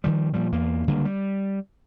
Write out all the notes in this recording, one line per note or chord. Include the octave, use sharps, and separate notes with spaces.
D#3 F3 G3
A#2 F3 G3
E2 A#3
C#2 D3 G3 A#3
G3